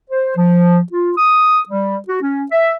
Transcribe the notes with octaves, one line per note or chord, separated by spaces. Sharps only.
C5
F3
F4
D#6
G3
F#4
C#4
E5